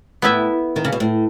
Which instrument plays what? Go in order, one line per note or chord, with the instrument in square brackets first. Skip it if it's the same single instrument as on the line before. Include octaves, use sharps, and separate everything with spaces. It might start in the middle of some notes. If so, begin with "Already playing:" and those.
[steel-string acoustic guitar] A2 [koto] B3 E4 B4 E5
[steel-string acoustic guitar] D#3
C#3
B2
A2